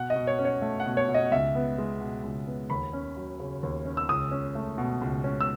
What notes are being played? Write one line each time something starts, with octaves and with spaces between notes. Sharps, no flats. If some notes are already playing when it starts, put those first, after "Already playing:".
Already playing: B2 F#5
D#5
B2
C#5
C#4
C#5
A3
F#5
B2
C#5
B2
D#5
C#2 E5
B3
G#3
B2
C#2
B3
D#2 B5
C#4
F#3
C#3
D#2
C#4
E6
C#2 D#6
C#4
A3
B2
C#2
C#4
E6